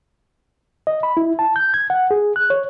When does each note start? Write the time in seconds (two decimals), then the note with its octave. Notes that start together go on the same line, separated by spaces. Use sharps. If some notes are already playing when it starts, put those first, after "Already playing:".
0.87 D#5
1.03 B5
1.17 E4
1.39 A5
1.56 G6
1.74 G#6
1.90 F#5
2.11 G#4
2.36 F#6
2.50 C#5